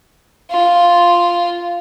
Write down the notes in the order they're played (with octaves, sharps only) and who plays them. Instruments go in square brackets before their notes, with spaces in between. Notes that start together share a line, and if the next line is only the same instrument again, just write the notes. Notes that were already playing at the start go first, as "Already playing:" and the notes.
[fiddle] F4